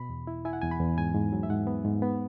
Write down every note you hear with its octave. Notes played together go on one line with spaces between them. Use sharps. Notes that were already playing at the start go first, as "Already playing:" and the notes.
Already playing: B2 B5
E2
E4
E4 G#5
F#5
E2 G#5
B5
E2
G#2 G#5
G#2
F#3
E5
G#2 F#5
B3
G#2
B3